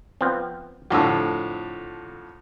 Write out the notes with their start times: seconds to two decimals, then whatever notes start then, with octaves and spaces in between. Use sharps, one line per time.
0.21 F3 B3 C4
0.90 F2 A2 D3 F#4 G4 A4